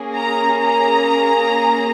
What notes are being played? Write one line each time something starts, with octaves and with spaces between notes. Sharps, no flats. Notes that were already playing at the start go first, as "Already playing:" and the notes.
Already playing: A#3 C#4 G#4
A#5
A#5